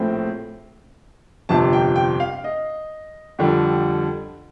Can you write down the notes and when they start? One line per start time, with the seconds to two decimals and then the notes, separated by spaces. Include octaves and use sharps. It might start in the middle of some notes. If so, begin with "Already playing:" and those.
Already playing: A#1 A2 A3 C4
1.49 G1 F2 C3 A5
1.73 G5
1.96 G5
2.20 F5
2.44 D#5
3.39 F2 D3 G3